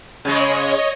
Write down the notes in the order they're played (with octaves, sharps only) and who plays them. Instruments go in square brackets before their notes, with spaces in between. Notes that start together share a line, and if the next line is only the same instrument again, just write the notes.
[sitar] C#3 G#3 [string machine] C#5 D#5